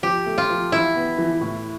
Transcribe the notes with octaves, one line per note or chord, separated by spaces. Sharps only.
F3 G4
A3
F4
F3
E3 E4
B3
E3
A2